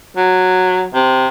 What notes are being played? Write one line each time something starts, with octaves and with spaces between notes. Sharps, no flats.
F#3
C3